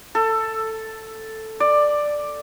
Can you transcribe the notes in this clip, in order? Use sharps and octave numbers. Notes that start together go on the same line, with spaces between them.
A4
D5